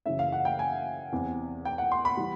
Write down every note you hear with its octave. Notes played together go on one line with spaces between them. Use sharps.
F#2 C#3 E3 E5
F5
F#5
G5
G#5
E2 C3 E3
G5
F#5
C6
B5
E3 G3